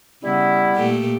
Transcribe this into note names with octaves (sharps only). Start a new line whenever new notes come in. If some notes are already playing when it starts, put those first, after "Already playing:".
C#3 G3 B3 E4
A#2 A3 G4